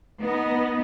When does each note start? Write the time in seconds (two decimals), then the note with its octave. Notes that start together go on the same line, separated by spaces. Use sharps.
0.19 B3 D#4